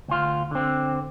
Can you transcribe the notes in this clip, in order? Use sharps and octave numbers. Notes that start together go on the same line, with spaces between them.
D2 F4
D3 C4